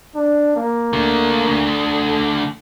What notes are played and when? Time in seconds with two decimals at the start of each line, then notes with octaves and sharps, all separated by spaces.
0.15 D4
0.56 A#3
0.93 D3 A3
1.85 A4